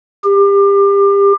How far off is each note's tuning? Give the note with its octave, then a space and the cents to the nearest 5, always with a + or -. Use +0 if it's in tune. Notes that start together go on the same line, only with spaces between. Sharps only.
G4 +30